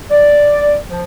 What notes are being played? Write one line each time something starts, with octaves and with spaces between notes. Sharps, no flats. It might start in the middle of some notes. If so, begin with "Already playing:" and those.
D5
F3